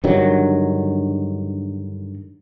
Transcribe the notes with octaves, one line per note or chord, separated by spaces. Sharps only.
G2 D3 D#3 F#3